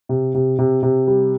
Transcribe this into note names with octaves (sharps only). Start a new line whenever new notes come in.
C3
C3
C3
C3
G3